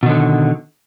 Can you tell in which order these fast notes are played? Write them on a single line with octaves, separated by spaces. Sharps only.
B2 D#3 D3